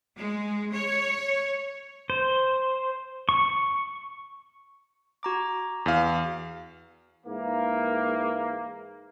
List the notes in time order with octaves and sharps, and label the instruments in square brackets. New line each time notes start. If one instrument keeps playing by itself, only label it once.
[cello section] G#3
C#5
[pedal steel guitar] C5
C#6
[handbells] F#4 A#5 D6
[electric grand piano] E2 F5
[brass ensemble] G#2 E3 A#3